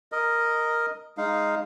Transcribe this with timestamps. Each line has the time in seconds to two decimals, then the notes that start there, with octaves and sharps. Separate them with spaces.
0.12 A#4 D#5
1.18 G#3 D#4 F5